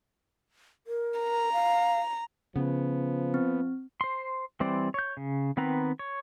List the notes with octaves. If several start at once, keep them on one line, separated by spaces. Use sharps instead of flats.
A#4
A#5
F5
C#3 F3 B3
C4
C5 C6
E3 G3 C4 C5 D5
C#5 G6
C#3
D#3 B3 C4 B4 A#5
C#5